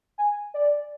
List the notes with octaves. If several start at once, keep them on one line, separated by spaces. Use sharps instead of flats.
G#5
D5